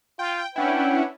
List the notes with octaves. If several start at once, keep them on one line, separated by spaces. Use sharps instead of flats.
F4 G5
C#4 D4 E4 B4 F#5 G5